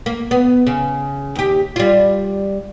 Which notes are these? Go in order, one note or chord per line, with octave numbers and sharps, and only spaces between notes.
A#3
B3
C#3
D#2 G4
G3 F4